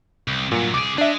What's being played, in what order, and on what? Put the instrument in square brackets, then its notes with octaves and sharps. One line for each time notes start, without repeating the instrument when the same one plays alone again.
[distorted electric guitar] C2
[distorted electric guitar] G2 F#3 [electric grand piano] A#2
[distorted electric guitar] C2 G#4 [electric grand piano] D6 D7
[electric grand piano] D4 E5 [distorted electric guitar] G#4 D#5